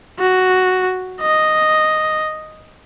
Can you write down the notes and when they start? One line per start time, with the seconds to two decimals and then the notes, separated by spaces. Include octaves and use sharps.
0.19 F#4
1.21 D#5